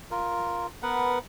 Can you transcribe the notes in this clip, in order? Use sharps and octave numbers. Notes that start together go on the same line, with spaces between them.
F4 A#4
B3 A#4 B4 F#5